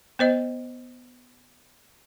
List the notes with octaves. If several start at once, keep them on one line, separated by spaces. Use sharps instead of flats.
B3 C5 D#5